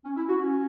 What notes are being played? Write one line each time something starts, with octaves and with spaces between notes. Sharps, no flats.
C#4
E4
F#4
C#4